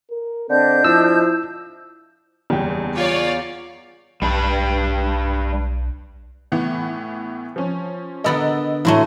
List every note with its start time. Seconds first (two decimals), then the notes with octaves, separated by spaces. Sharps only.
0.11 A#4
0.49 D3 C4 D4 D#5 G6
0.85 F3 E4 E6
2.50 F#1 E2 G3 G5
2.97 F4 C#5 D5 F5
4.22 B1 G3 D4 B4
6.52 A2 E3 B3
7.56 F3 C#4
8.24 D3 B3 A#4 D#5 E6 A6
8.85 A2 E3 F#3 A3 C6 D#7